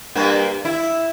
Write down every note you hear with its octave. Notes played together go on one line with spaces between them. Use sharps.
G2 A#3
E4